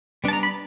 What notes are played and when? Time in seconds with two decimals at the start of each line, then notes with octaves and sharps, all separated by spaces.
0.24 G3 B3 D4 A5
0.33 A#5
0.43 B5